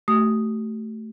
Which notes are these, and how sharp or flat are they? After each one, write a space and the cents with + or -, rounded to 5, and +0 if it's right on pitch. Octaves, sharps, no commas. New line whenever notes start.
A3 +0 G4 -45 D#6 +0